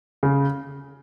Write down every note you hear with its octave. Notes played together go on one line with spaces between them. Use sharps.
C#3